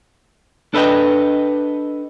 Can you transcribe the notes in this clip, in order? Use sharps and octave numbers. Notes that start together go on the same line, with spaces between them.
D4 A4 B4 D#5 G5